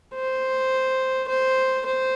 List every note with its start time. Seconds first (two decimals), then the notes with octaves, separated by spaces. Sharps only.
0.14 C5
1.28 C5
1.85 C5